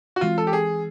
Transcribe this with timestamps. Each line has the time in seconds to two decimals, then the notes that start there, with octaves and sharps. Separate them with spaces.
0.16 F#4
0.21 E3 G#3 C4 F4
0.38 A4
0.47 G4
0.53 G#4